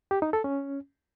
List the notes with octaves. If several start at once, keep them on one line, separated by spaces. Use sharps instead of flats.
G4
D#4
A4
C#4